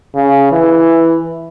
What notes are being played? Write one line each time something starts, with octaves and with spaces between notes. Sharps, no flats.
C#3
E3